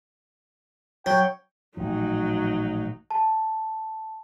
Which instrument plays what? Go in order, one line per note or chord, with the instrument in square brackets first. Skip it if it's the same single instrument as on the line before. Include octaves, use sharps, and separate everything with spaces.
[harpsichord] F#3 [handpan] C#5 [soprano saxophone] G5
[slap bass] A1 A#2 F3 [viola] F#3 D#4
[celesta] A5